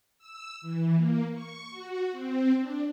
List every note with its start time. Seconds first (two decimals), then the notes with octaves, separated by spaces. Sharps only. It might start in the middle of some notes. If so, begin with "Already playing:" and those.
0.18 E6
0.61 E3
0.96 A#3
1.32 C#6
1.71 F#4
2.12 C4
2.59 D4